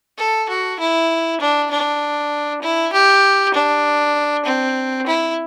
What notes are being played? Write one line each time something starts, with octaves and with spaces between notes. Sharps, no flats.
A4
F#4
E4
D4
D4
E4
G4
D4
C4
E4